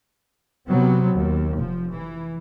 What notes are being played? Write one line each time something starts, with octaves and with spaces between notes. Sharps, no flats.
C3 F#3 B3 C4
D#2
F1 F3
E3